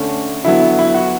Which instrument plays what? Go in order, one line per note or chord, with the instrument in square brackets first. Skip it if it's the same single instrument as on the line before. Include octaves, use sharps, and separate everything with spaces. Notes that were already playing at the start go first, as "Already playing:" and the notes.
Already playing: [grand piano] D3 A3 C#4
D3 F#3 B3 E4
E4
F#4